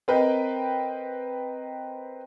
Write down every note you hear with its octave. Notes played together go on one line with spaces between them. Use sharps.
C4 A#4 B4 D#5 G5